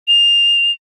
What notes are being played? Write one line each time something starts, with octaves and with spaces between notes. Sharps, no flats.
F7